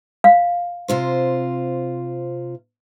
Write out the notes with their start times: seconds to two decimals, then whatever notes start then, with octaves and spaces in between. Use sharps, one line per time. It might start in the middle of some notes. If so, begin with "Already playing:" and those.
0.24 F5
0.88 C3 F4 C5